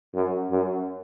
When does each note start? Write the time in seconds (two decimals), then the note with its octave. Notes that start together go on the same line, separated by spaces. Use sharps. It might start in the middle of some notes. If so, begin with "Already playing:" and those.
0.15 F#2
0.51 F#2